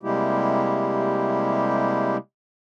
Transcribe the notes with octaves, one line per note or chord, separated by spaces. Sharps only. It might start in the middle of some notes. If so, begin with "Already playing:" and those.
C3 G3 G#3 A#3 E4 G4